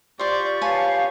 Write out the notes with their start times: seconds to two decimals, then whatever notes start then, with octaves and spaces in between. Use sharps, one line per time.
0.19 F4 G4 C5 D5 C6 C#6
0.62 B4 C#5 F5 G#5 A5